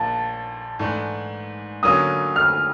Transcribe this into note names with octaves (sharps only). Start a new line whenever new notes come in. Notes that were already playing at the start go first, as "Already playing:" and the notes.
Already playing: A#1 A#2 F3 A#3 A5
G#2 E3 A3 D4
D3 F#3 A#3 C#4 F4 D#6
F6